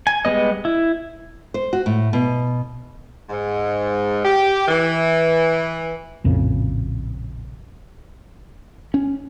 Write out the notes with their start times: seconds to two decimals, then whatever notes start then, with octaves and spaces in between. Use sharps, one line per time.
0.07 G#5
0.25 G3 G#3 B3 D#5
0.65 E4
1.54 C5
1.73 F#4
1.86 A2
2.13 B2
3.29 G#2
4.23 G4
4.67 E3
6.24 A#1 F2 A2 C#3
8.94 C#4